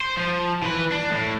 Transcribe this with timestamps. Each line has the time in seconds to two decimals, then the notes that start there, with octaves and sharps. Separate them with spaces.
0.01 C5
0.17 F3
0.62 E3 B4
0.92 D4
1.11 A2